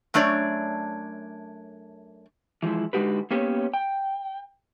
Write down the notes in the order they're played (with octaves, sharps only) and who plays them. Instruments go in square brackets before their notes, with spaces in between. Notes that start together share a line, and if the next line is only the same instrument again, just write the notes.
[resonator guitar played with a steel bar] F#2 A3 D4 C#5 D5
[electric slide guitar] E3 F3 G#3 E4
D3 G#3 D#4 F#4 G4 B4
A#3 B3 C#4 G4 C#5
G5